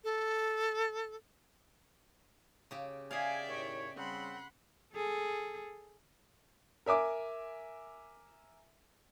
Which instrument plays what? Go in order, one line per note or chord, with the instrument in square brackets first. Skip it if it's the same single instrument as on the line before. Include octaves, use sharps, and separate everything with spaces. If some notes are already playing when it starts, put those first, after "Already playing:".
[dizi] A4
[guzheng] C#3 G4
[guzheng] G#4 F5 [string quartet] D5 E5 G5 [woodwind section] G#5
[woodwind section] D#2 A2 C#5
[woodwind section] C#3 G3 C4 [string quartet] F#5 B5 C6
[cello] G#4 A4
[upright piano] A#4 E5 G#5 D6